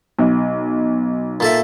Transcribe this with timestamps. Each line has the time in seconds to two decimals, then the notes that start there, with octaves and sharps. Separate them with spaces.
0.19 B1
1.40 A#2 A4 E5